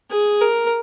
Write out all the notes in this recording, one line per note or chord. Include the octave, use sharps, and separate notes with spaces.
G#4
A#4